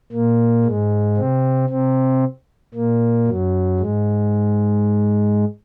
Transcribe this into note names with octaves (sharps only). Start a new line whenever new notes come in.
A#2 A#3
G#2 G#3
C3 C4
C3 C4
A#2 A#3
F#2 F#3
G#2 G#3